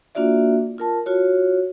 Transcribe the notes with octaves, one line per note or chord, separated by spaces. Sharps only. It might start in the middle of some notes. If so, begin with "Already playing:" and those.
A#3 D4 F4 F#4 D5 E5
F4 A#4 A5
F4 F#4 C#5